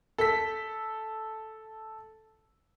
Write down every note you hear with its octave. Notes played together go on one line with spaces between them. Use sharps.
A4 B6